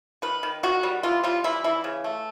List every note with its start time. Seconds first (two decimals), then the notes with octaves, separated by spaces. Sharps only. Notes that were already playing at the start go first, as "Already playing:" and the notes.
0.22 D#3 B4
0.43 D#3
0.63 D#3 F#4
0.83 G3
1.03 E3 F4
1.24 G3 F4
1.44 E3 E4
1.64 E3 E4
1.84 C#3
2.04 A3